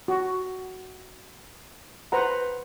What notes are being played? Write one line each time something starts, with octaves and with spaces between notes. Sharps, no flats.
F#4
B4 C5 F#5 A#5